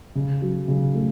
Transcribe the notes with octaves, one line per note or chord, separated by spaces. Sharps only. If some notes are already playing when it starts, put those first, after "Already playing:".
C#3
F#3
C#3
A3